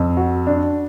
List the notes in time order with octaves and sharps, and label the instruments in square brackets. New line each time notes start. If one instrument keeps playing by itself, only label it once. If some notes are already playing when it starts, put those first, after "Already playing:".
Already playing: [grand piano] F2
F#4
D4